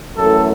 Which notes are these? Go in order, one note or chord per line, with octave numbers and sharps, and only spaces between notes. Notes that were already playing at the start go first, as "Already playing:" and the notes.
F#2 E3 A3 A4